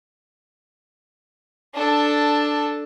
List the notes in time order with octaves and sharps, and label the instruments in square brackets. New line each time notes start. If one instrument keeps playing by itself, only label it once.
[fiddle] D4 A4